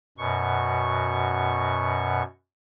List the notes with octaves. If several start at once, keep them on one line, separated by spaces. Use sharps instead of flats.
F#2 B2 C#6